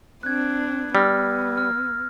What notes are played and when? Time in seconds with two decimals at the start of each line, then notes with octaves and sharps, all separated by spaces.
0.23 C4 D4 F#6 G#6
0.95 G3 B3 E6 F6 A#6
1.57 F6